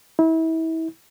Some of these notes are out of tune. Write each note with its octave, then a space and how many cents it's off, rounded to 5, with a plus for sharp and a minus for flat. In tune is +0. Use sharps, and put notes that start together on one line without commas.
E4 -30